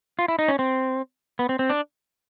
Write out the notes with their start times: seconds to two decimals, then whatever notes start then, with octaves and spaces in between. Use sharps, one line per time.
0.19 F4
0.28 E4
0.39 D#4
0.48 C#4
0.59 C4
1.39 B3
1.49 C4
1.59 C4
1.70 D4